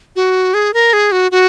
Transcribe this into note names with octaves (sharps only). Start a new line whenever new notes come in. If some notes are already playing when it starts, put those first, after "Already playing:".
F#4
G#4
A#4
G#4
F#4
F#4